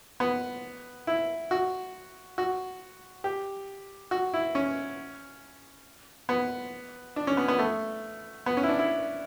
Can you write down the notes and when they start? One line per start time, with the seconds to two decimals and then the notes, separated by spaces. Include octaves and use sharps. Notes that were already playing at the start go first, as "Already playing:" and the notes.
0.20 B3
1.07 E4
1.51 F#4
2.38 F#4
3.24 G4
4.11 F#4
4.34 E4
4.55 C#4
6.29 B3
7.16 D4
7.27 C#4
7.37 B3
7.48 B3
7.59 A3
8.46 B3
8.57 C#4
8.63 E4
8.68 D4
8.79 E4